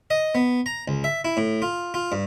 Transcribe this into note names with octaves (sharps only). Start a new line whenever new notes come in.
D#5
B3
A#5
C#2
E5
E4
A2
F4
F4
G2